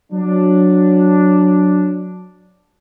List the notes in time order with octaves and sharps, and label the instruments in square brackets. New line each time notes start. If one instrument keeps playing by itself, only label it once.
[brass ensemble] F#3 D4